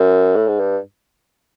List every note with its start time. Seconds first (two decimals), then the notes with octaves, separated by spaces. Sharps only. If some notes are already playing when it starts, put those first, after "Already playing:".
Already playing: F#2
0.35 A2
0.47 G#2
0.60 G2